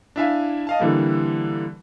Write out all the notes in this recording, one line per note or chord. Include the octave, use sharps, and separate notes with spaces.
D4 E4 E5 F5 G#5
D#5 F5 A5
D3 E3 G3 A#3